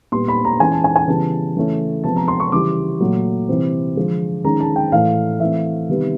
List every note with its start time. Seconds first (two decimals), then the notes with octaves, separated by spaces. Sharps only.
0.12 A#2 G3 B3 C6
0.28 B5
0.45 A#5
0.60 E3 G#3 C#4 G#5
0.72 A5
0.84 G#5
0.96 G#5
1.08 C#3 E3 G3 B3 A5
1.56 C#3 E3 A3 C#4
2.04 C3 F3 G#3 B3 A5
2.16 A#5
2.28 C6
2.40 C#6
2.52 C#3 E3 G3 D6
3.00 A#2 F#3 A3
3.49 C3 E3 G3 C4
3.96 D3 F3 G#3
4.45 D#3 G#3 C#4 A#5
4.60 A5
4.76 G5
4.92 A2 E3 A3 F5
5.40 E3 A3 C4 E5
5.88 C3 D#3 G3 B3